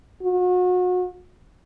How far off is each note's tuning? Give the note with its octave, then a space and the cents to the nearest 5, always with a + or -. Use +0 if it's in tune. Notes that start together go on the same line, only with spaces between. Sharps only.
F#4 -35